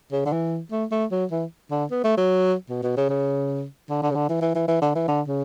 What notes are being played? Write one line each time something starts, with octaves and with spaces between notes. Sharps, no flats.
C#3
D3
E3
A3
A3
F#3
E3
D3
B3
A3
F#3
B2
B2
C#3
C#3
D3
D3
C#3
D3
E3
E3
E3
E3
D3
E3
D3
C#3